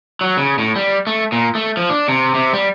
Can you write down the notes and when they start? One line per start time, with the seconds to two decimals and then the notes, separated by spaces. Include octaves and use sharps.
0.21 F#3
0.37 C#3
0.59 A2
0.76 G3
1.07 A3
1.32 A#2
1.55 A3
1.77 F3
1.90 D4
2.08 C3
2.35 C3
2.53 G3